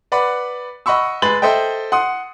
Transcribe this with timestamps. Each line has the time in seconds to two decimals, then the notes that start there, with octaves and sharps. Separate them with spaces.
0.12 B4 D5 F#5 B5
0.86 D#5 F#5 B5 C#6 E6
1.22 G#3 B4 B5 A6 F#7
1.42 A4 C5 D#5 E5 G5
1.92 F#5 C6 D#6